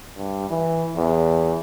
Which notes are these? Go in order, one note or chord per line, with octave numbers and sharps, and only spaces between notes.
G2
E3
E2